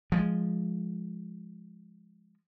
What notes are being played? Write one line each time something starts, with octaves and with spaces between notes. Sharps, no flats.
F3 G#3